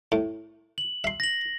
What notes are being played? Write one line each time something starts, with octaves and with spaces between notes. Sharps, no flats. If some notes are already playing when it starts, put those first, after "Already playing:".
A2
F#7
E5 C6
A#6 F#7